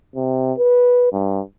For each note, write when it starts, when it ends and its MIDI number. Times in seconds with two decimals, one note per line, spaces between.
0.16 0.53 48
0.58 1.08 71
1.12 1.40 43